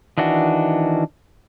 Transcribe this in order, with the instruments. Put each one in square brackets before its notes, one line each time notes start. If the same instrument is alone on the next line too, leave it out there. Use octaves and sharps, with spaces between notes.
[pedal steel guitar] D#3 E3 D4 F#4